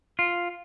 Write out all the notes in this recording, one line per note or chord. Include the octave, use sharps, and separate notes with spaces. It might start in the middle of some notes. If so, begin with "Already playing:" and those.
F4